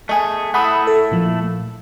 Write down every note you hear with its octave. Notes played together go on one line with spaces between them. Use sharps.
A3 G#4 D#5 G#5
A3 E4 F#5 B5 D#6
A4
A#2 F3